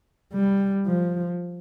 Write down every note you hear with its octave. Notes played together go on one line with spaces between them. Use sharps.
G3
F3